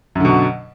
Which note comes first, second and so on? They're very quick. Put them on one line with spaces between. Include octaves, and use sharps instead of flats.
F#2 D3 B2 F#3